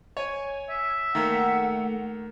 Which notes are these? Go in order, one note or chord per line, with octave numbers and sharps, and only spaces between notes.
C#5 G#5
E5
D#3 A3 A#3 F#5